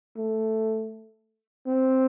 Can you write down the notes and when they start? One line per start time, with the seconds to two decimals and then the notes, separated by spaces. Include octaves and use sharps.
0.17 A3
1.67 C4